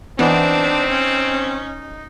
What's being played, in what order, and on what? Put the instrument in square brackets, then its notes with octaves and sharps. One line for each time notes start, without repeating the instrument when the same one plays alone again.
[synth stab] E3 B3 [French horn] C4 [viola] D4 [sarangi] D#4
[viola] C#4